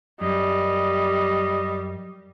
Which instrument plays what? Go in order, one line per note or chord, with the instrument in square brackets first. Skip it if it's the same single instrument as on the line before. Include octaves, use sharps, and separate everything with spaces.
[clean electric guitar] F#2 [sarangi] G3 [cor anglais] D#5